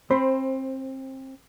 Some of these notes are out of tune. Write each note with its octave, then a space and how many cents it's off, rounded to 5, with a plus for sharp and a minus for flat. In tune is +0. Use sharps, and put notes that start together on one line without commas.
C4 +25 C5 +10 B5 +25